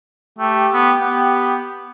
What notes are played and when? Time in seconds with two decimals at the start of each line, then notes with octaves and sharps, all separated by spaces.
0.38 A3 G4
0.73 B3
1.00 B3